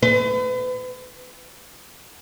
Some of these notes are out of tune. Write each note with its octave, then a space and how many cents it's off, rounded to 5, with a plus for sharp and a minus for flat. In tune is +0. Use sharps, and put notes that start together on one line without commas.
B4 +35